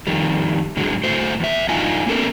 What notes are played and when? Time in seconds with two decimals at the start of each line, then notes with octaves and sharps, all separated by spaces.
0.07 F2 D#3 G3
0.77 G#2 D3 F#3 G#3
1.04 A2 A3 F#4 C5
1.40 E2 E5
1.68 G2 D4 D#4 F4 G#5
2.06 A#3 B3 C#4 A4 A#4